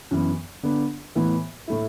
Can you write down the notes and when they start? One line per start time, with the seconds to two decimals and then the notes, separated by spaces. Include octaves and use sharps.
0.11 F#2 E3 B3
0.63 D3 B3 D4
1.15 A2 E3 B3
1.67 A2 A3 E4